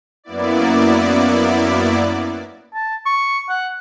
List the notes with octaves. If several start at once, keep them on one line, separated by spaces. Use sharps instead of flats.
F#2 A#3 B3 E4 D5
A5
C#6
F#5